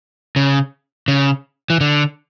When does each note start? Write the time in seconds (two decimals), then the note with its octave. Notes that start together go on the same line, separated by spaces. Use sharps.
0.36 C#3
1.08 C#3
1.70 E3
1.81 D3